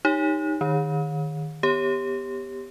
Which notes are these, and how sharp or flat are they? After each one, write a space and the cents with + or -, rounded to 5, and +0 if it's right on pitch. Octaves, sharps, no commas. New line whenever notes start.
D#4 +0 G4 +0 C#5 +0
D#3 -10 C#5 -20
B3 +0 G4 +10 C#5 -15